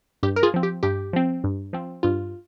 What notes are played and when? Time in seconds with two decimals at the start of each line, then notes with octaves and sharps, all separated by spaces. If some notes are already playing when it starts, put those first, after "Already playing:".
0.23 G2 G4
0.36 A#4
0.43 F4 G#4
0.54 F3 C4
0.63 G4
0.83 G2 G4
1.13 F3 C4
1.44 G2
1.73 F3 C4
2.03 G2 F4